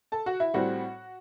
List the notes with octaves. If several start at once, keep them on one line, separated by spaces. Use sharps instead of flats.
A4 A5
F#4 F#5
E4 E5
A2 G3 C4 F#4 F#5